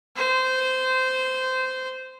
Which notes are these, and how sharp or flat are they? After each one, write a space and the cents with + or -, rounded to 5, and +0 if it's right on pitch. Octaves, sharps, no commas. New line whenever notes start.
C5 -15